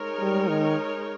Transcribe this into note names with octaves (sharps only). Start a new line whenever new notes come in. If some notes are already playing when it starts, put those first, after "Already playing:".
Already playing: G#3 D#4 A#4 C#5
G3
D#3